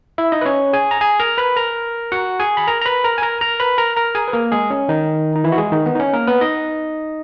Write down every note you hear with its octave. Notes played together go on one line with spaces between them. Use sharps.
E4 E5
D#4 D#5
B4
C#4 C#5
G#4 G#5
A#5
G#4 G#5
A#4 A#5
B4 B5
A#4 A#5
F#4 F#5
G#4 G#5
B5
A#4 A#5
A#5
B4 B5
A#4 A#5
G#5
A#4 A#5
A#4 A#5
B4 B5
A#4 A#5
A#4 A#5
G#4 G#5
B4
A#3 A#4
G#3 G#4
C#4
D#3 D#4
D#4
E3 E4
F#4
G#3 G#4
D#3 D#4
B3
D#4
C#4
A#3 A#4
B3 B4
D#4 D#5